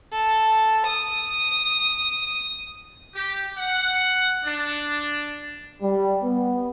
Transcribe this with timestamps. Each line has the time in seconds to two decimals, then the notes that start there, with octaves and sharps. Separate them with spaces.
0.12 A4
0.86 D#6
3.15 G4
3.57 F#5
4.45 D4
5.82 G3
6.23 B3